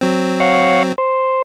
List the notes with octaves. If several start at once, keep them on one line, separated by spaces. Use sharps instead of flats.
F#3 C4
C#5 F5 F#5
C5